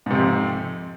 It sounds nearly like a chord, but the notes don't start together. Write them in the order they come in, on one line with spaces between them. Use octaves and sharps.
G#2 C3 F2